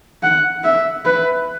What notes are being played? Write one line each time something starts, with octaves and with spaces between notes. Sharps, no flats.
F#5
E5
B4